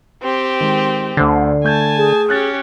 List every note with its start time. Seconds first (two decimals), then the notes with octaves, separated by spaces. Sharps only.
0.22 C4 G4
0.61 D#3 G#3
1.17 D2 D3 C5 C7
1.64 A3 G#5 A5 G6 G#6
1.97 G#4
2.29 C#4 G4 F6 F#6 A6